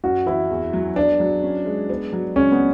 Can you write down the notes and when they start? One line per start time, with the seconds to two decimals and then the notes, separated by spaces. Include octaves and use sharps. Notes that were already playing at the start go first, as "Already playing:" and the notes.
0.04 F#2 F#4
0.26 E3 E4
0.50 E2
0.73 F#3
0.96 B3 D4
1.20 F#3
1.43 C#4
1.66 G#3
1.89 B3
2.13 F#3
2.36 C#2 C#4
2.52 B3